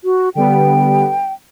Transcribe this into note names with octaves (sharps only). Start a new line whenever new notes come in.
F#4
D3 G3 B3 G5